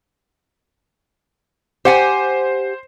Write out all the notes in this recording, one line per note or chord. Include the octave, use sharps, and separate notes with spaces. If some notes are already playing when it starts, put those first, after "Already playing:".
G4 C5 F#5 G#5